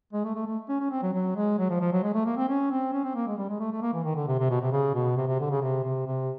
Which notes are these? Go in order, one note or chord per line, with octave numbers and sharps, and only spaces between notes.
G#3
A3
A3
A3
C#4
C#4
C4
F#3
F#3
G#3
F#3
F3
F3
F#3
G#3
A3
A#3
C4
C#4
C4
C#4
C4
A#3
G#3
G3
G#3
A3
A3
A#3
E3
D#3
D3
C3
C3
B2
C3
C#3
B2
C3
C3
D3
C#3
C3
C3
C3